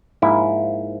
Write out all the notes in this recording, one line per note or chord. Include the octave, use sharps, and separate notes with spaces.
G#2 F3 A#3 E4